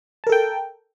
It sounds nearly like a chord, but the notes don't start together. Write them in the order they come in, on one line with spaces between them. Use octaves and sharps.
A5 A#4 A4 G5